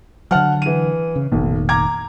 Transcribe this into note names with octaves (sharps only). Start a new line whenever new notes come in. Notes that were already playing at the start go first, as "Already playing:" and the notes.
D3 F#3 F#5 A5 F6
E3 D#7
C#3
F1 B1 A#2 D#3
A#5 D6 G#6